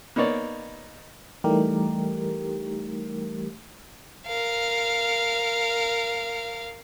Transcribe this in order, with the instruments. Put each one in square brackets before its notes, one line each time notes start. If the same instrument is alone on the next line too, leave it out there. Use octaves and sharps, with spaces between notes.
[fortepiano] A#3 B3 D#4 C#5 D5
[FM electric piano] E3 G3 A3 D#4 G4 A#4
[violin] A#4 F5